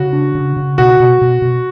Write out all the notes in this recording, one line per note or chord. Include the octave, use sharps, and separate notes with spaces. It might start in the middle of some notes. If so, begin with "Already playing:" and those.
Already playing: C#3 F#4
D4
C#3
C#3
B2 F#4
B2
B2
B2